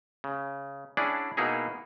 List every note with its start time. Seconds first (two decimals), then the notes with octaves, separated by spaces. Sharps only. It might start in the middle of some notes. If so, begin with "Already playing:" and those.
0.24 C#3
0.97 C#4 D4 E4 G#4 D5 F#5
1.37 B2 A#3 D#4 E4 G#4